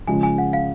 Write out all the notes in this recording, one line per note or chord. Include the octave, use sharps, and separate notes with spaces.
C#3 F3 G#3 G#5
G#5
F#5
F5